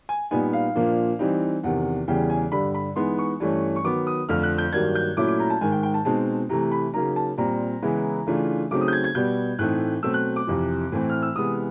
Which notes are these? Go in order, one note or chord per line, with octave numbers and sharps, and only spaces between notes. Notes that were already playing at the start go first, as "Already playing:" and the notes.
G#5
A#2 G3 B3 D#4 G#5
F5
A#2 F3 A#3 D4
E3 G3 C4 D#4
E2 C3 D#3 F#5
E2 C#3 E3 G3 G5
G#5
G2 D3 G3 B5
B5
E3 G#3 B3 D#4 C6
C#6
G2 E3 A3 C#4
C#6
D#3 F#3 B3 D6
D#6
F2 D3 F3 A3 F6
F#6
G6
G2 D#3 F#3 A#3 G#6
G6
A#2 F#3 A3 C#4 E4 D6
D6
A#5
A5
G#2 D#3 G#3 G#5
G5
G5
A5
B2 G#3 C4 D#4 A5
C3 E3 A3 A#5
B5
C#3 F#3 A#3 D#4 A#5
A5
A#2 G3 C4 A#5
C#3 E3 G#3 B3 E4
C#3 E3 A3 D4 F4
C#3 F#3 A3 C4 D#4 D6
D#6
G6
G#6
G#6
B2 G3 B3 G6
A2 E3 A3 C4 D#4 F#6
B2 F#3 A3 C4 E6
F#6
D6
F2 C3 E3
A2 E3 A3 C4 E4
F6
E6
C3 E3 G#3 B3 D#6